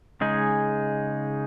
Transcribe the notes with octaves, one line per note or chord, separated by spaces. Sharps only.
C#3 G#3 D#4 G#4